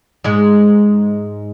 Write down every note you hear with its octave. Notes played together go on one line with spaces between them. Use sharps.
G#2 G#3